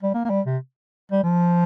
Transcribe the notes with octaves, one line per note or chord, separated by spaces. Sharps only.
G3
A#3
A#3
G3
C3
G3
F3